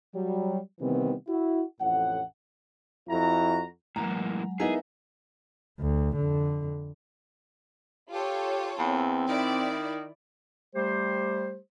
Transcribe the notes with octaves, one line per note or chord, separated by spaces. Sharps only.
F#3 G3
C3 D#3 E3 G3 B3 C4
E4 F#4
A1 F2 A2 F#5
F2 E4 F#4 A#5
A2 E3 F#3 G#3 A#3 A#5
B3 D#4 E4 G#4 A#4 E5 G#5
D2
F2 D3
F4 G4 A4 C#5
E2 C4
D#3 E4 D5
G3 A3 G4 C5